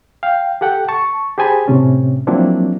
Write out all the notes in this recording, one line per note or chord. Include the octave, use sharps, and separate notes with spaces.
F5 G5
G4 A4 F#5 G5
A5 C#6
G4 G#4 C5 G#5 A5 B5
A2 C3 C#4
F3 F#3 A#3 C4 D4 E4